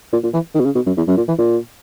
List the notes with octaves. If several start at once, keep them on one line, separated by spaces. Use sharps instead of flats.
A#2
A#2
E3
D#3
B2
C#3
B2
F#2
E2
F#2
A#2
E3
A#2